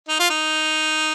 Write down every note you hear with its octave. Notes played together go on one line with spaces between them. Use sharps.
D#4
F4
D#4